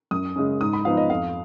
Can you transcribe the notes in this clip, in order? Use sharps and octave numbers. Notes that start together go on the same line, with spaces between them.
F#2 D#6
C#3 G#3 C#4
G#2 D#6
B5
F3 B3 D#4 F5
D#5
F2 F5